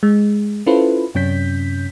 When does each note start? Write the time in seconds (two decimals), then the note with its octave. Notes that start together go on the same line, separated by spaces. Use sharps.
0.03 G#3
0.66 C#4 E4 F4 A4 B4 C5
1.15 F#2 C3 C#4 G6 B6